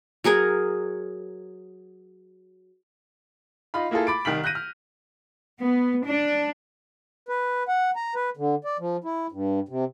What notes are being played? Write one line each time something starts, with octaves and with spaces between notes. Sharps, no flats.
F#3 G#4 A#4 G#5
D#4 F4 F5 B5
A#3 E4 F4 G#4 A4
B5 D6 A6 D7
C2 D#3 F6 B6 F#7
F#6 G6 A#6 D#7
F6
B3
D4
B4
F#5
A#5
B4
D3
D5
F3
E4
G2
C3